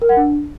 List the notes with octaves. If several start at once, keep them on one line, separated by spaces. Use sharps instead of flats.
A#4
F#5
D4